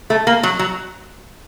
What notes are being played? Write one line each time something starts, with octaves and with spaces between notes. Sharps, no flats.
A3
A#3
F#3
F#3